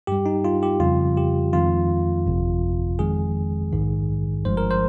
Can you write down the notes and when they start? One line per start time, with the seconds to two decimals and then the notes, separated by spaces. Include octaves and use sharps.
0.07 G2 G3 G4
0.26 D#4
0.45 F4
0.63 G4
0.80 F2 C#3 G3 F4
1.17 G4
1.53 F2 D#3 G#3 F4
2.26 G1 F2 C3
2.99 F2 D#3 G#3 G#4
3.73 A#1 G#2 D#3
4.45 G1 G2 F3 G#3 C5
4.57 A#4
4.71 C5